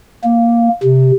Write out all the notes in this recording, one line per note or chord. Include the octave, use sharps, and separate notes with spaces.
A#3
C3